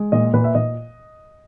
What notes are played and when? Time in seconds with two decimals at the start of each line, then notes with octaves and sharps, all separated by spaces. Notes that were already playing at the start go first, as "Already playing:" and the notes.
Already playing: G#3
0.12 A#2 D#5
0.34 A#2 B4
0.44 E5
0.55 A#2 D#5